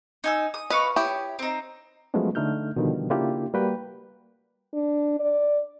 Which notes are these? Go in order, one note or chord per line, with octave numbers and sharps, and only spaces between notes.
D#4 G#5 E6
D#6
B4 D#5 F5 C#6
E4 G4 C#5 D#6
C4 D#4
F3 F#3 G#3 A3 B3 C#4
D3 A3 D#4 F6 G6
B2 D3 D#3 F3 G3
C#3 A#3 D4 E4 F4 G4
G3 A#3 F#4 B4 G5
D4
D5